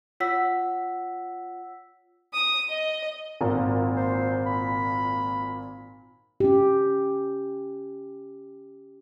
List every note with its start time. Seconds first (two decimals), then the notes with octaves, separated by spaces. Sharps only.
0.20 F4 C#5 F#5 E6 B6
2.32 D#6
2.69 D#5
3.41 G#1 A#2
3.97 C5
4.46 B5
6.40 C#4 G4